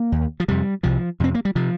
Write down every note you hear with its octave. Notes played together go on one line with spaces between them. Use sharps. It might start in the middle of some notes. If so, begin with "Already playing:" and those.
Already playing: A#3
D#2
F3
F2 C3 G3
C2 C3 F3
F2 C3 C4
A#3
G3
C3 F3